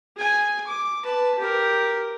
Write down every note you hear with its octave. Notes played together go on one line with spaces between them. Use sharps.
G#4 G#5
D6
B4 A5
G4 A#4